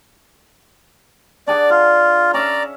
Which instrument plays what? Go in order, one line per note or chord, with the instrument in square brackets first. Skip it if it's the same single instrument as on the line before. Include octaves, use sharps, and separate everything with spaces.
[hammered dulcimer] D4 G#4 F#5 [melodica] D5
[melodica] F4 [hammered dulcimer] F5
[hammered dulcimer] C#4 E5 F5 [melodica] D5 A#5